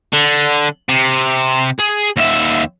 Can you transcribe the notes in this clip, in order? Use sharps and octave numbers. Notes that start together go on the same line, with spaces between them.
D3
C3
G#4
D#2 E5